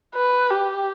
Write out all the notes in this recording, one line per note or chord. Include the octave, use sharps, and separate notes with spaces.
B4
G4